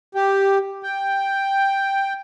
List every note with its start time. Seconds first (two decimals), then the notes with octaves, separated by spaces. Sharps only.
0.15 G4
0.83 G5